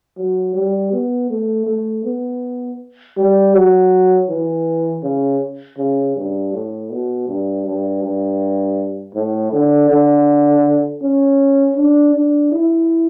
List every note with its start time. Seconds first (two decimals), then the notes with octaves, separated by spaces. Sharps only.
0.17 F#3
0.54 G3
0.92 B3
1.30 A3
1.66 A3
2.05 B3
3.17 G3
3.54 F#3
4.29 E3
5.03 C#3
5.78 C#3
6.16 G2
6.53 A2
6.90 B2
7.28 G2
7.65 G2
8.03 G2
9.15 A2
9.52 D3
9.90 D3
11.02 C#4
11.77 D4
12.14 D4
12.52 E4